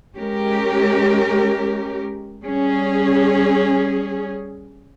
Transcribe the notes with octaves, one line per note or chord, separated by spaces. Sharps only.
G#3 C#4 G4 A#4
G3 C#4 G#4